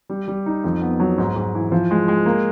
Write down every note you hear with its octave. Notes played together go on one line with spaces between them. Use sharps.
G3
G3
D#4
F2
B3
F#3
G#2
G#2
E3
F3
G#3
G#3
A#3